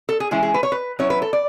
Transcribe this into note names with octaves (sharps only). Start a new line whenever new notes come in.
A4
G#4
E3 G#3 C#4 E4 G#4
G#4
B4
C#5
B4
F#3 C#4 E4 C#5
B4
A4
D5